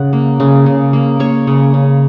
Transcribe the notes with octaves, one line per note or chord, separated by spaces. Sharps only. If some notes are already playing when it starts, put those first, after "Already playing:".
Already playing: C#3 F#5
A#3
C#3
C#3
A#3
A#3 C#5
C#3
C#3